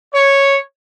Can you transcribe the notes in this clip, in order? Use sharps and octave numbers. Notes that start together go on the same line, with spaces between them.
C#5